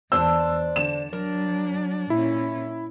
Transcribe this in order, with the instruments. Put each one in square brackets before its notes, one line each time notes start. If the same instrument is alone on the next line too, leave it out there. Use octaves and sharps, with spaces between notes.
[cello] E2 [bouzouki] D4 C5 [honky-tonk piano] E6
[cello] D3 [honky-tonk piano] E7
[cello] F#3 D4 [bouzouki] A#4
[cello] A#2 C#4 [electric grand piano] E4